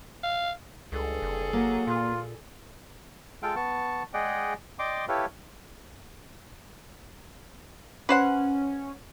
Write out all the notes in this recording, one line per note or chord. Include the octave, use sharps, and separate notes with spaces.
F5
C#2 G2 G#4 A4
F#1
F#3 A#3
A#2 F4
G#3 F4 A4 F5 G5
B3 A5 C#6
G#3 G#4 D5 D#5 F#5 G5
D5 D#5 G5 C6 D6
E4 G4 A4 B4 C#5 F5
C#4 B4 C5 F#5